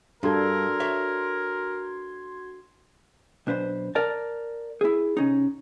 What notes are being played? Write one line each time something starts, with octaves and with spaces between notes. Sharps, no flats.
G2 D4 F#4 A4 A#4 C6 G#6
C#5 E5
B1 D4 B4 C5
A#4 D5 A5
E4 G#4
C3 C#4 D#4